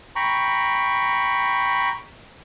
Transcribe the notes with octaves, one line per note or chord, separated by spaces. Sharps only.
G5 A#5 B5 C#6